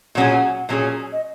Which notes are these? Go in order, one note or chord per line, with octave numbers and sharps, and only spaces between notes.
A#2 F#3 C#4 G#4 F#5
A#2 F#3 C#4 G#4
D#5